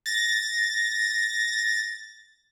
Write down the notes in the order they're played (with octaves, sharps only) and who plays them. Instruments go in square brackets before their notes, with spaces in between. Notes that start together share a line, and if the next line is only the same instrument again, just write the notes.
[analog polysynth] A6 A#6